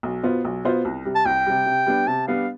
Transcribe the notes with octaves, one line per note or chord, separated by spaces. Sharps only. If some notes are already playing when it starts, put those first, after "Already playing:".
B1
B2 B3 F4 C5
B1
B2 B3 F4 C5
C2
C3 G3
A5
C2 G5
C3 G3
C3
G3 B3 D4
C3 A5
G3 B3 D4 F5